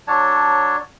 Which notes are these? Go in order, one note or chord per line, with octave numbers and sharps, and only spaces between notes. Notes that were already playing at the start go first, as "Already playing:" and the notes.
F#3 D4 C#5 A5